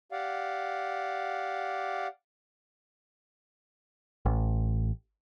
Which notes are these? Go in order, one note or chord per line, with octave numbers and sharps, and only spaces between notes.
G4 D5 F5 F#5
A1